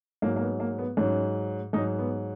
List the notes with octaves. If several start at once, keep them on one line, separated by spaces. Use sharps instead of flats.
G#2 F#3 A#3
A#3
B3
A#3
B3
G#2 F#3 C#4
G#2 F#3 D#4
B3